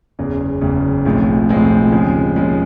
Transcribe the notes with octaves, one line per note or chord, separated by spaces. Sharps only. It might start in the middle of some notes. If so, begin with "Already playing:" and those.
F#1 E2 C#3
F#1 E2 C#3
B1 A2 F3 G#3 C4
B1 A2 F3 G#3 C4
D#2 C#3 F3 G#3
D#2 C#3 F3 G#3